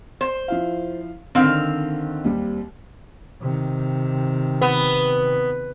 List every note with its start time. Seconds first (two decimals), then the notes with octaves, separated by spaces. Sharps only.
0.21 C5
0.48 F3 E4 F5
1.35 D3 D#3 C4 F5
2.24 D#2 G3
3.41 C3 D#3
4.61 B3